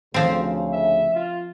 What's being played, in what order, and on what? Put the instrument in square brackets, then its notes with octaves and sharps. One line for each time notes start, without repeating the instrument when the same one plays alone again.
[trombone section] D2 C#3 [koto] F3 C4
[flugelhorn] E5
F4